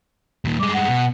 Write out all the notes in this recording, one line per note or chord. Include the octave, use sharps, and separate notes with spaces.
D#2 A#2
G2 G#3 D6
F#5
B2